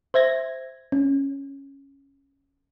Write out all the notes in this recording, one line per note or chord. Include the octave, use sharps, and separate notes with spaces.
C5 E5 G#6 A#6
C#4